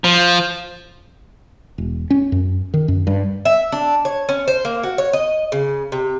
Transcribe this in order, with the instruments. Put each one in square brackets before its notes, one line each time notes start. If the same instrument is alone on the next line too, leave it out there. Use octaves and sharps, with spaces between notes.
[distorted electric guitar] F3
[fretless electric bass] E1
C#4
F#2
D#3
F#2
G2
[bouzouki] E5
D4
C#5
C#4
C5
A#3
F#4
C#5
D#5
C#3
C3